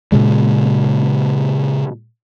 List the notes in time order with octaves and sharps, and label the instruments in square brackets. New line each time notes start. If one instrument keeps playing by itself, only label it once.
[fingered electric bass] A#2 C#3 G#3